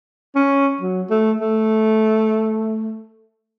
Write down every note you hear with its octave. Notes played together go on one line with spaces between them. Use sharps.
C#4
F#3
A3
A3